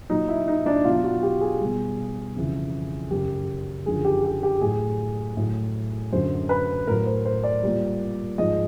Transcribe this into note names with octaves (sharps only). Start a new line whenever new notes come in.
A#2 F#3 D#4
E4
D#4
D4
B2 F#3 F4
F#4
G4
G#4
B2 G3
F2 C#3 E3
F#2 C#3 F#3 G4
F#2 D3 F3 G#4
G4
G4
G4
A2 F#3 G#4
A2 F#3
F#2 D3 F#3 C5
B4
A2 F#3 A#4
C5
C5
D5
A#2 G3
G#2 F3 G#3 D#5